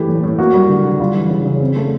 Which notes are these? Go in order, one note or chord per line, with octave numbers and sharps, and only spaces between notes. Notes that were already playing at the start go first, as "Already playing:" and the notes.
Already playing: E3 A3 G4
A2
A2
A#3 F#4
G3
D3
D3
G3 F4
E3
C#3
C#3
C4
A3